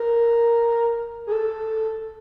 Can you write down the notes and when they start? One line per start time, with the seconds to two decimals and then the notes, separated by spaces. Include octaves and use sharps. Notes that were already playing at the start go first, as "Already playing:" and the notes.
Already playing: A#4
1.27 G#4
1.32 A4